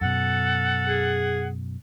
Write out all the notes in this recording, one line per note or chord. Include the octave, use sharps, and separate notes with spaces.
F#2 B2 A4 F#5
G#4